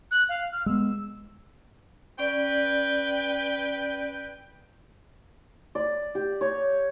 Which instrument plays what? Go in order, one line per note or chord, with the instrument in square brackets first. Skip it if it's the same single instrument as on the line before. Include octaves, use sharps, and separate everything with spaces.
[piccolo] F#6
F5
F6
[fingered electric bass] G#3 B3 [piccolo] E6
[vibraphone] C#4 D5 [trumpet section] B4 G5
[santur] D5
G4
C#5